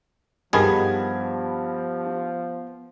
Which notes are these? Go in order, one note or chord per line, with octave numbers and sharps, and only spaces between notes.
G2 D#3 F3 B3 G#4 B5 G#6